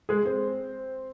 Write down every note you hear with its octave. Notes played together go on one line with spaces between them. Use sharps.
G#3 G#4
C4 C5